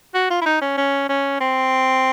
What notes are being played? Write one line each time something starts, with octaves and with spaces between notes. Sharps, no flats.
F#4
F4
E4
D#4
C#4
C#4
C#4
C4